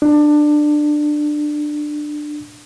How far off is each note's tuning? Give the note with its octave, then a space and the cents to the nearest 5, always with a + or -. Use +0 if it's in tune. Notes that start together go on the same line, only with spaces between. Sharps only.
D4 +20